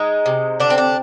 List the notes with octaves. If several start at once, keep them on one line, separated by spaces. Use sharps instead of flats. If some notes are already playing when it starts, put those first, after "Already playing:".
Already playing: G#3 D#4
C3
D3 D4
C4
D4